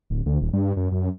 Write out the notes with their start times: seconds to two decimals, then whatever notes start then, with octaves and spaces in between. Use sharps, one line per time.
0.10 D1
0.26 D2
0.42 D#1
0.53 G2
0.77 F#2
0.92 F#2